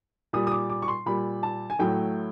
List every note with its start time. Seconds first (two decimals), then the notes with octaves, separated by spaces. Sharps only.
0.33 A#2 G3 D#6
0.47 D#6
0.52 D6
0.70 D6
0.82 C#6
0.88 C6
1.06 A#2 G3 B5
1.43 A5
1.70 G#5
1.79 A2 F#3 A3 G5